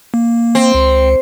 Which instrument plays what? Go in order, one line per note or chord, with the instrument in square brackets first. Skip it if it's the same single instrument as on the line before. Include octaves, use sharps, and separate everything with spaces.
[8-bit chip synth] A#3
[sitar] C4
[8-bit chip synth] C#2